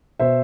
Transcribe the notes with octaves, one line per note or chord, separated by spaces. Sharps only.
B2 C5 E5